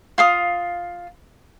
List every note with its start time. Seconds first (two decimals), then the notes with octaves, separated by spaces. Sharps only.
0.18 F4 F5 D#6